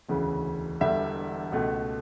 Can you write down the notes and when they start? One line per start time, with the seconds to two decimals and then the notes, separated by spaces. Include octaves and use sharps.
0.08 E1 D2 C#3 E3
0.80 E1 E2 D3 G3 E5
1.52 C#2 B2 A3